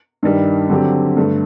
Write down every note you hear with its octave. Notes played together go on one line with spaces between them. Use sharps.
G2 D#3 G3
D3 F#3 C4 G4
G2 D3 A3